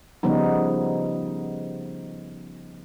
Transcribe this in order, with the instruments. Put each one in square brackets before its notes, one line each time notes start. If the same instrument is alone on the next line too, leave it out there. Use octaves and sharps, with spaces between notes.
[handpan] C#3 F3 G3 B3 D#4